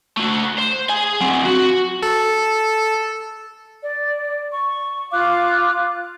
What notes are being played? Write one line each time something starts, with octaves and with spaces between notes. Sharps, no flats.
A3 F#4
C5
G#4 G#5
F#3 C4
F#4
A4
D5
C#6
F4 F5 D6 F#6